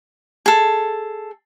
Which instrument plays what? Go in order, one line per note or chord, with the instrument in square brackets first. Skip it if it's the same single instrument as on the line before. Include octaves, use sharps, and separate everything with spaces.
[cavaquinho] G#4 A4